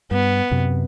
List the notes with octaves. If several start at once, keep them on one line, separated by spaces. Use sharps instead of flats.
G2 B3
F#2 C3